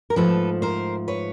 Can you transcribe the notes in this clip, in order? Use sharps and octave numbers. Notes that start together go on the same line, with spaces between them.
A#4
G#2 F3 A3 A4 B4
A#4 C5
B4 C#5